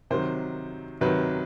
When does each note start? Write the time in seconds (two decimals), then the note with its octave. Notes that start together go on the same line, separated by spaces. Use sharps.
0.11 C3 D#3 F#3 C5
1.01 C3 D#3 F#3 B4